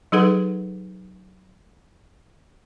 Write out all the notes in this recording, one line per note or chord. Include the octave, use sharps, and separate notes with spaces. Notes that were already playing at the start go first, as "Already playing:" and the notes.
F#3 D#4 G#4 A4 B4 F#5